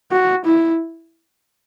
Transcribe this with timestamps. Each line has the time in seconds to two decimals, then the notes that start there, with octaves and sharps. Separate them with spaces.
0.12 F#4
0.45 E4